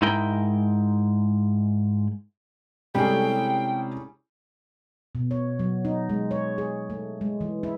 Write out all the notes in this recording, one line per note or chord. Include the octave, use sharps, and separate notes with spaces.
G#2 G#3 E4 A#4 G5
A2 C3 G3 G#3 C#4 G#4 G5
B2
C#5
F#3
D#4
G#3
C#5
G#4
A3
G#3
E3
E4